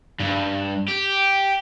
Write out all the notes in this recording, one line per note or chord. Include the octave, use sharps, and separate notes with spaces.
G2
G4